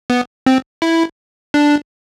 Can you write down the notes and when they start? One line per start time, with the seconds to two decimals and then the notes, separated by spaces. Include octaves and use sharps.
0.10 B3
0.46 C4
0.82 E4
1.54 D4